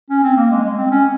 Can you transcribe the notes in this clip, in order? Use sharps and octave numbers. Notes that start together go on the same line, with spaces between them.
C#4
C4
A#3
G#3
G#3
C4
C#4